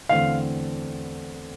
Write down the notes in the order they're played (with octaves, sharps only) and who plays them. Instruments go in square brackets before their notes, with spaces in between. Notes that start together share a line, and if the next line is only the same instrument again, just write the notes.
[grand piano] E2 D3 A3 C4 F5